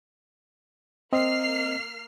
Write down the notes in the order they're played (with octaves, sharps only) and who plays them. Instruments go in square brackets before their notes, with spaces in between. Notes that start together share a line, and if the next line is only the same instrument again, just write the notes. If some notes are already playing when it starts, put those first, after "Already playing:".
[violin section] A#3 F6 C7 [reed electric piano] C4 D#5